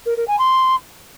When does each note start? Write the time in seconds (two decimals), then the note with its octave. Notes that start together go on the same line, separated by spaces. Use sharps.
0.06 A#4
0.16 A#4
0.27 G#5
0.38 C6